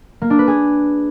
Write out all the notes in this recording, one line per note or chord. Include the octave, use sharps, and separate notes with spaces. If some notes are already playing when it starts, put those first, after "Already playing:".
A#3
D4
B4
G#4